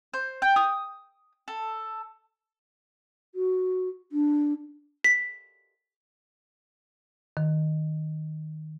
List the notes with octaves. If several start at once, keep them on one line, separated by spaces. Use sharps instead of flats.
C5
G5
D#6
A4
F#4
D4
B6
D#3